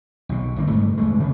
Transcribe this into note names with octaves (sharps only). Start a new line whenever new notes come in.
B1 B2
G1 A#3 C4
G2 A3
E2 G#3 A3
C3 A#3 C#4 D4